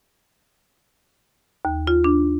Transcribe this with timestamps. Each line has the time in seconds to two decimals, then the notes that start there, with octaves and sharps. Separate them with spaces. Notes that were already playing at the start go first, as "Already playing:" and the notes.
1.65 D#2
1.87 F4
2.04 D4